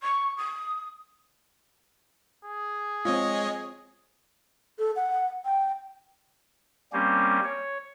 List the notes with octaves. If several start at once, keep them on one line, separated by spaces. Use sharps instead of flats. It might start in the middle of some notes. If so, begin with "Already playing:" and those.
C#6
D#6
G#4
G#3 C4 F4 C#5 D#5
A4
F#5
G5
G3 A#3 C4 C#4 G4
C#5